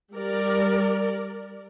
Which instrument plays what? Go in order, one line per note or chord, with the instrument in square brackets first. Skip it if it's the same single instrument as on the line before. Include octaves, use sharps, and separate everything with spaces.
[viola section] G3 A#4 D5